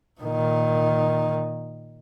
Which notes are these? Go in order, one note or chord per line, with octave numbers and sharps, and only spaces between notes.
A#2 D#3